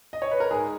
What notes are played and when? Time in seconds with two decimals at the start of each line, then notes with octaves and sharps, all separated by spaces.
0.13 D#5
0.22 C#5
0.31 B4
0.40 A#4
0.50 G#2 G#4